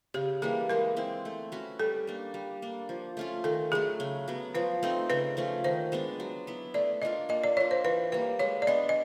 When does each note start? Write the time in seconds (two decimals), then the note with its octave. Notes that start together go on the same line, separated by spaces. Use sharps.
0.14 C#3 G4
0.42 E3 G3 A#3 G#4
0.70 G#3 A#4
0.97 C4 E4
1.25 A3
1.52 C#4 F#4 B4
1.79 G3 A4
2.07 A#3 D4
2.34 G3
2.62 A#3 D4
2.89 F3
3.17 A3 C#4 F4
3.44 D#3 A4
3.72 F#3 A3 G#4
4.00 C#3
4.28 F#3 B3
4.55 F3 B4
4.83 A3 C4 D#4
5.10 C#3 B4
5.37 F3 A3 C#4
5.64 D#3 C5
5.92 G#3 B3 D4
6.20 F#3
6.47 B3 E4
6.74 A3 D5
7.02 D4 F4 A#4 D#5
7.29 A#3 D#5
7.44 D5
7.57 D4 F4 C#5
7.71 C5
7.84 E3 B4
8.12 G3 A#3 B4
8.39 G#3 C#5
8.62 D5
8.67 B3 D4 D#5
8.89 D#5